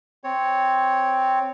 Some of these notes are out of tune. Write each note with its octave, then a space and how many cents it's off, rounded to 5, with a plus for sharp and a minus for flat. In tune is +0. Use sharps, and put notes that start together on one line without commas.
C4 +0 C#5 +0